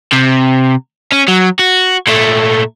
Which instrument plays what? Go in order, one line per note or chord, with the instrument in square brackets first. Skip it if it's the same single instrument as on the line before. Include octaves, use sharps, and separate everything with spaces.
[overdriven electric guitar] C3
C#4
F#3
F#4
A#2 A3